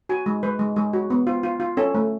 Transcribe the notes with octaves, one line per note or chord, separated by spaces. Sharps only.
F#4 G#5
G#3
G#3 B4
G#3
G#3 G#4
F#4
B3
F4
F4
F4
C#4 A4
A3